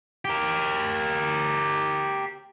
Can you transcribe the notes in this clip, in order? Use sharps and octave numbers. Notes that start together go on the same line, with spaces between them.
G4 A#4